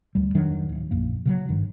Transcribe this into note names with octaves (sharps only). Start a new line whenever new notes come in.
D2 G3
F1 D#3 F#3 D4
D1
A#1 F#2 A#3
C#3 F3 F#3
G#1 G2 D#3